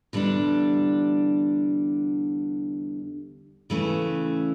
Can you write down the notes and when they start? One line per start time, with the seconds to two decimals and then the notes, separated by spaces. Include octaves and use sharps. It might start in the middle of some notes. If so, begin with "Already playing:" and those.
0.13 E2 D3 G3 D4
3.70 C#3 E3 A3 C#4